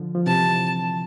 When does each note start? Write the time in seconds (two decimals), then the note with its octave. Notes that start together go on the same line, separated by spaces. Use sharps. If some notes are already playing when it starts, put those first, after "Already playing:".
Already playing: D3 F3
0.15 F3
0.26 C3 E3 A5